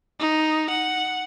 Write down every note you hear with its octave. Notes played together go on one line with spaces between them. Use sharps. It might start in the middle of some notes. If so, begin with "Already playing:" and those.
D#4
F#5